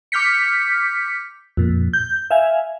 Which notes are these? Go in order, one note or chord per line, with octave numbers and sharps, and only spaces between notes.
D6 F6 G6 B6 C#7
F2 A#2
G6
E5 F5 G#5